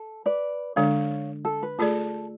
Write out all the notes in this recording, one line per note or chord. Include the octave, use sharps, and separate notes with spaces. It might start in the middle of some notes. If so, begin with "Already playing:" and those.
Already playing: A4
B4 D5
D3 G#3 D4 C#5 F5
A4
B4
A3 F4 G#4 A4 D5